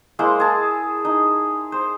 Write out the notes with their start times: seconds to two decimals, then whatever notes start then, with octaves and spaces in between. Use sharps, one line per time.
0.19 G#3 A#3 E4 C5
0.40 G#4 A5
1.05 D#4
1.72 C5